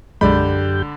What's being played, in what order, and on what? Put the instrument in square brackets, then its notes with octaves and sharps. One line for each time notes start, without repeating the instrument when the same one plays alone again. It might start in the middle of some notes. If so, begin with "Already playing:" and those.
[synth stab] B1 G#3 [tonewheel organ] F#2 G4 G6 [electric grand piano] D3 D5 B5